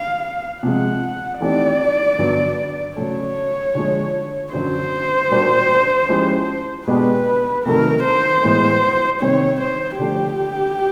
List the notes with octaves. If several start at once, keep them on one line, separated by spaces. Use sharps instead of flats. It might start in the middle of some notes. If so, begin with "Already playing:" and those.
Already playing: F5
C3 F3 G#3 F#5
E3 A3 C4 D#4 G4 D5
G2 D3 F#3 B3
C#3 F#3 A3 C#5
D3 F3 G#3
F#2 D3 F#3 C5
A#2 G3 A#3 D4 F#4
F3 G#3 C#4 E4 G4
B2 G#3 B3 D4 G4 B4
C3 D#3 F#3 A3 A#4
C5
A2 E3 G#3 B3
C3 D#3 G3 C4 C#5
C5
D3 F3 A3 D4 G4